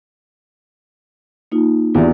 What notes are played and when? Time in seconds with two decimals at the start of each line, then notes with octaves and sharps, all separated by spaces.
1.52 A#3 D#4 F4
1.95 E2 F4 G4 D5